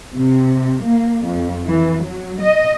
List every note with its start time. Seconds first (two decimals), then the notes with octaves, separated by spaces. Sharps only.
0.14 C3
0.83 A#3
1.26 F2
1.65 E3
2.01 F#3
2.40 D#5